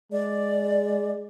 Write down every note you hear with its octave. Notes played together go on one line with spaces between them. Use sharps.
G#3 D5